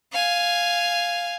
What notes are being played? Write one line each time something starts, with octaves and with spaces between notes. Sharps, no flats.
F5 G#5